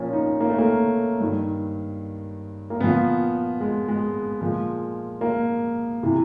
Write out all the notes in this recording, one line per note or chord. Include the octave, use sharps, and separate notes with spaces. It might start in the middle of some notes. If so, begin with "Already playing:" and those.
Already playing: A#2 F3 C#4
D#4
A#3
A3
A#3
G2 D#3
A#3
A#2 F3 B3
G#3
G#3
A#2 F3 G#3
A#3
C3 E3